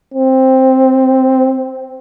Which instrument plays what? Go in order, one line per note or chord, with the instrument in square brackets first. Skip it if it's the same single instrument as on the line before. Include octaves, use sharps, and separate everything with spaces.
[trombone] C4